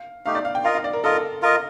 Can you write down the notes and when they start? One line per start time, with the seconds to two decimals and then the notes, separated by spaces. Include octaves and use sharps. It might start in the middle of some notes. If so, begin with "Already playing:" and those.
Already playing: F5
0.26 A3 D#4 G4 F5
0.35 D5
0.45 F5
0.55 G5
0.64 F4 A#4 D#5 F5
0.74 F5
0.84 D5
0.93 A#4
1.04 F4 A4 A#4 D#5
1.42 F4 A#4 D#5